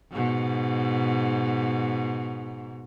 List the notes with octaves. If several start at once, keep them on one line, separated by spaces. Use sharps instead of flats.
G#2 B2